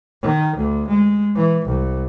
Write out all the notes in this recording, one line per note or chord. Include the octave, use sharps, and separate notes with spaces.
D#3
D2
G#3
E3
C2